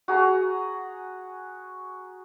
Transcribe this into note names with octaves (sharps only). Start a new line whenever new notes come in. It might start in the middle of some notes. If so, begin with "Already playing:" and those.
F#4 G#4 A#5